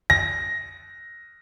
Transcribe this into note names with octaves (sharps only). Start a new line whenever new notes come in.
A#6